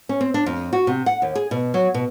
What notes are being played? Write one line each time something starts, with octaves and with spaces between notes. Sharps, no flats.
C#4
C4
D4
F2
F#4
C3
F#5
D#2
G#4
B2
F#3
B2